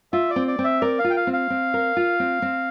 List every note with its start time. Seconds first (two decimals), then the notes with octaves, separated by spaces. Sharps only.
0.13 F4 E5
0.30 D5
0.36 C4
0.47 D5
0.59 C4
0.64 E5
0.81 A#4 D5
0.99 F5
1.04 F4
1.10 G5
1.16 F5
1.27 C4
1.33 F5
1.50 C4
1.74 A#4
1.97 F4
2.20 C4
2.42 C4